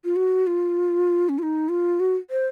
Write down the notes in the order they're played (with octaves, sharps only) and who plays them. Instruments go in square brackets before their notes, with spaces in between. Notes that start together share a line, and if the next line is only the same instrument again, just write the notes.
[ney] F4
F#4
F4
C#4
F4
D#4
F4
F#4
C5